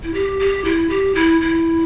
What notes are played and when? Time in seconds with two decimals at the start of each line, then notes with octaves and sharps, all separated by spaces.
0.03 E4
0.14 G4
0.40 G4
0.65 E4
0.90 G4
1.15 E4
1.41 E4